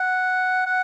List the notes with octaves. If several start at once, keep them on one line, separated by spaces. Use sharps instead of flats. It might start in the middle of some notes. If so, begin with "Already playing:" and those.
Already playing: F#5
F#5